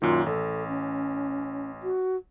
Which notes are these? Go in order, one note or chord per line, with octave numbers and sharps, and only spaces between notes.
F#2 A#2 D#3 F4
A1 A4
C#4
F#4